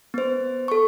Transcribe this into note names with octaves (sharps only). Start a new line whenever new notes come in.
B3 C5
A4 C#6